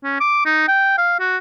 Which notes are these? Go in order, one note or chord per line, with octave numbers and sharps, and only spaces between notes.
C#4
D6
D#4
G5
F5
F#4